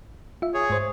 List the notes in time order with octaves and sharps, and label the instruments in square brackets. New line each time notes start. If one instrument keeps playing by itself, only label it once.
[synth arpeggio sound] F4 E5
[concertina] G#4 C#5
[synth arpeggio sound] G#2 C5